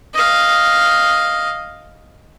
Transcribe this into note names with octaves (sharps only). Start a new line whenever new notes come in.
D#5 F5